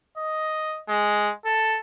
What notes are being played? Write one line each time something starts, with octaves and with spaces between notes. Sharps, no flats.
D#5
G#3
A4